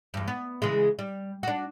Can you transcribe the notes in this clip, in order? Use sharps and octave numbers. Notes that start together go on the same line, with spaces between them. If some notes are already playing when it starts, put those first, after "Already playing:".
E2 G2
B3
C#3 E3 G#3
G3
D4 F#4